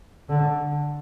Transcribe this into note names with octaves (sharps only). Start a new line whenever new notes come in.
D3